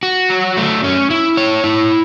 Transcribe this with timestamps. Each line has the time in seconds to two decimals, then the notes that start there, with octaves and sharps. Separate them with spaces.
0.03 F#4
0.30 F#3
0.57 A3
0.84 C#4
1.10 E4
1.37 C#5
1.64 E4